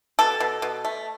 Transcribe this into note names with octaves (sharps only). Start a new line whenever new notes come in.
B2 A4
B2
B2
A3